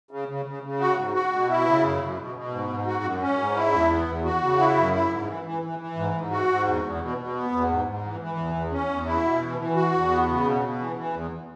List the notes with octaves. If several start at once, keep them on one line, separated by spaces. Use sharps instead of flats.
C#3
C#3
C#3
C#3
F#4
G#2
F#4
B2
E4
C#3
F#2
F#2
B2
B2
G#2
G#2
F#4
F#2
C#4
G#2
E4
E2
B3
E2
F#4
C#3
E4
F#2
E4
G#2
E3
E3
E3
E3
G#2
G#2
F#4
G#2
E2
E2
B2
B2
B3
E2
G#2
G#2
E3
E3
E2
E2
C#4
E2
E4
B2
E3
E3
F#4
E2
B3
C#3
B2
B2
E3
E3
E2